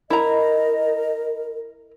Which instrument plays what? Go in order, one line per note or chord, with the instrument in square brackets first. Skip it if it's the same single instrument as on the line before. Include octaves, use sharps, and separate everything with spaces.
[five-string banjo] E4 A#5 [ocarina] A#4 [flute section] D#5